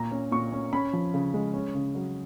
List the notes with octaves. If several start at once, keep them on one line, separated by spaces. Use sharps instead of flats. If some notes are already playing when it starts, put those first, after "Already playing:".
Already playing: A#2 A#5
C#4
A#2 C#6
C#4
C#4 B5
F3
C#3
G#3
C#4
C#3
F#3